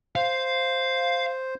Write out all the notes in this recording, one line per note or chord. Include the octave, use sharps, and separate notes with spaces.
C5 F5